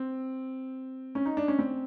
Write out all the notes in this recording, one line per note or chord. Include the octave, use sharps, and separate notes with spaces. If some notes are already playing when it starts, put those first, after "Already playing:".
Already playing: C4
C#4
D#4
D4
C#4
C4